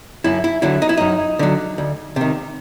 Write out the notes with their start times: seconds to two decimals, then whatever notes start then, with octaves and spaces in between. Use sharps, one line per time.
0.24 F#2 E4
0.44 E4
0.62 D3 F#3 E4
0.82 D#4
0.89 E4
0.97 F#2 D#4
1.39 D3 F#3
1.78 D2
2.16 C3 D#3